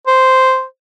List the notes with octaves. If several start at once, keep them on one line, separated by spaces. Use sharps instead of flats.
C5